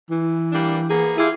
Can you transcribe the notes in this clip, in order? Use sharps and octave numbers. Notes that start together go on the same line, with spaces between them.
E3
G3 A#3 D4
A#3 B3 G#4
E4 F4 G4 G#4